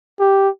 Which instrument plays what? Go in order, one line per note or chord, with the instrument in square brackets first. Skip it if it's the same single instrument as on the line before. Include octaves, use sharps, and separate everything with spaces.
[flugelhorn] G4